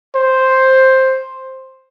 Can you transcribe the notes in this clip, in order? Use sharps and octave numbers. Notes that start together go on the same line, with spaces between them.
C5